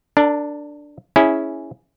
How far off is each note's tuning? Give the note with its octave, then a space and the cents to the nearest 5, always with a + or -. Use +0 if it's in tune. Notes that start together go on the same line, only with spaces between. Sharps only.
D4 +0 A#4 -40
C#4 +0 E4 -15 G#4 +0